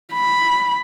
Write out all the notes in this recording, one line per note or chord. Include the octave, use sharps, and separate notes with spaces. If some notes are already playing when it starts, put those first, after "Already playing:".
B5